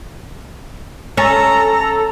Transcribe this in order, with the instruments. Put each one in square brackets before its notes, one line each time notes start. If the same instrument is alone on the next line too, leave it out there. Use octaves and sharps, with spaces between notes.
[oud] C#4 [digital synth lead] A4 [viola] A#5